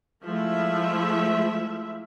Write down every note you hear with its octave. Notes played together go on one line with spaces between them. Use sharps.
F3 G#3 A3 E4 E5